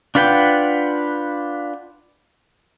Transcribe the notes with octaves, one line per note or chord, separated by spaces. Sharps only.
D4 F4 B4 F#5 G5